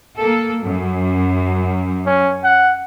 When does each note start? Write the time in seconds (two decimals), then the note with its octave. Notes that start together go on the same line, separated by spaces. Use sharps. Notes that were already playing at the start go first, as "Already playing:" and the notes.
0.19 A#3 A4
0.60 F#2
2.06 C#4
2.44 F#5